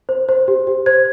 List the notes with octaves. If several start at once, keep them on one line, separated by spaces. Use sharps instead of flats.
C5
C5
G4
G4
C5 G#6